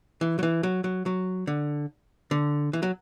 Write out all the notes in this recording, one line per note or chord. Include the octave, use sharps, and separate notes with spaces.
E3
F#3
E3
F#3
F#3
F#3
D3
D3
E3
F#3